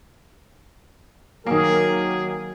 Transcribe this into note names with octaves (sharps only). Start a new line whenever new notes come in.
D#3 F#3 A#3 G#4 A#4